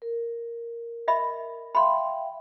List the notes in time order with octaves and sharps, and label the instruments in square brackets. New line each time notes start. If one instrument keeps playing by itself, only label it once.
[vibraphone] A#4
[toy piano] D#5 E5 B5
[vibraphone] E5 F5 G5 [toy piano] B5 C6